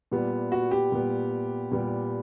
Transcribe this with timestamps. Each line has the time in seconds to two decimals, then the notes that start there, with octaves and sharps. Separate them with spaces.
0.11 A#2 G3 B3
0.52 F#4
0.71 G4
0.92 A#2 G3 B3
1.72 A#2 G3 B3